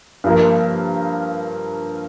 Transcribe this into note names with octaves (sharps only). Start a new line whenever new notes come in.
G2 F3 A#3